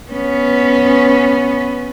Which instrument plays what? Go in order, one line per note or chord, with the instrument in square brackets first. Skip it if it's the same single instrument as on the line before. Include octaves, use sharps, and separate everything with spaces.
[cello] B3 C#4